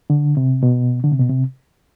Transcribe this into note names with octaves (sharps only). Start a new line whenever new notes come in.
D3
C3
B2
D3
C3
B2
C3